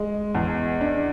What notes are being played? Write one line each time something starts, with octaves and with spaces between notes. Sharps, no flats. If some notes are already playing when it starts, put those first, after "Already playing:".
Already playing: G#3
E2
D4